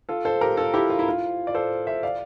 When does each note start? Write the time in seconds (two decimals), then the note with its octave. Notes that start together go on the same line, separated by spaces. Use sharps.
0.09 F4 A4
0.25 A4 C5
0.41 G4 A#4
0.57 F4 A4
0.74 E4 G4
0.90 F4
0.99 E4
1.09 F4
1.47 D5
1.54 A4 C5
1.87 C5 E5
2.03 D5 F5